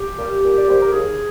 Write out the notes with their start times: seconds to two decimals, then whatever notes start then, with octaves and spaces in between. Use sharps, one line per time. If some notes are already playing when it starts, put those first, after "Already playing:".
Already playing: G4
0.18 G3 A#3
0.44 A#2
0.58 D5
0.68 G3 A#3 C5
0.82 A#4
0.92 D#2 G#4